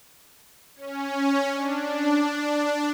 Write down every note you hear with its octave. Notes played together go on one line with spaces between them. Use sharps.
C#4
D4